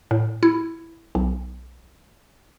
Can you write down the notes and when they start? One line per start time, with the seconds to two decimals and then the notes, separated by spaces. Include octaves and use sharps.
0.11 A2
0.43 E4
1.15 B1